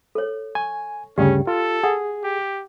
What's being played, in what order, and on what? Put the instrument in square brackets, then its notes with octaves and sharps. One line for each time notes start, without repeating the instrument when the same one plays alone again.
[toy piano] A4 C#5
[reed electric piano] G#5 [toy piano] C#6
[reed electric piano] D2 G2 C#3 [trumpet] C#4 [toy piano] G4 D5 G5
[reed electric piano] F4 [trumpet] A4
[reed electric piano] G#4 [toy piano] F#5
[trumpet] G4